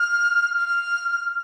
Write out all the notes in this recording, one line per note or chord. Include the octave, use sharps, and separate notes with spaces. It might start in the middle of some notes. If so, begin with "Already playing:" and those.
Already playing: F6
F6